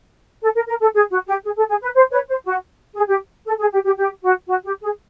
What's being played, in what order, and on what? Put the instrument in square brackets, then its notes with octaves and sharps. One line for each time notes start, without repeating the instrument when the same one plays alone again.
[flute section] A4
A#4
A#4
A4
G#4
F#4
G4
G#4
A4
G#4
B4
C5
B4 C#5
C5
F#4
G#4
G4
A4
G#4
G4
G4
G4
F#4
F#4
G4
G#4